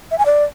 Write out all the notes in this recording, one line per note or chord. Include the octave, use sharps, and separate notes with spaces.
E5
G#5
D5